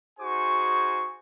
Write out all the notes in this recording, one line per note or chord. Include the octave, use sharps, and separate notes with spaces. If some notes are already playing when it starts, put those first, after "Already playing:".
D#4 F#4 G#4 C5 G#5 C#6